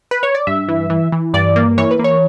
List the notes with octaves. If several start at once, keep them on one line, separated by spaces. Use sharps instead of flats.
B4
C#5
D5
G2 E5
E3
E3
E3
G2 D5
A#3
E3 C#5
B4
A#3
C#5